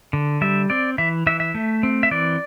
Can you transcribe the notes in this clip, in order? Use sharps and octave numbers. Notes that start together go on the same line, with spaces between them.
D3
G3 E5
C4 D5
E3 E5
E3 E5
E5
A3
C4
E5
E3 D5